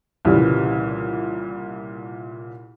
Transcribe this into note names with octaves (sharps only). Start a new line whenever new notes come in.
C2 A#2 C#3 E3 G3